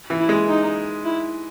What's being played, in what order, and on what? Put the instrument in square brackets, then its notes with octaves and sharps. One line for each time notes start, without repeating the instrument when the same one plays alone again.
[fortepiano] E3
[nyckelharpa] E4
[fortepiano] G#3
[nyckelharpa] D#4
E4